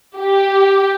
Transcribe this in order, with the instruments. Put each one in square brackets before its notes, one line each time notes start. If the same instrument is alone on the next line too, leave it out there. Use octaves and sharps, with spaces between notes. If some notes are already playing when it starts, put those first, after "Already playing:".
[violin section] G4